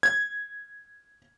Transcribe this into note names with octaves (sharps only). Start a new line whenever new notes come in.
G#6